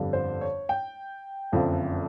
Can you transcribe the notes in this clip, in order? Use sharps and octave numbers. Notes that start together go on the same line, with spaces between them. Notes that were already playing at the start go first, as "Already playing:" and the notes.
Already playing: G1 F2 D3 G3
C5
C#5
G5
F#1 F2 D3 F3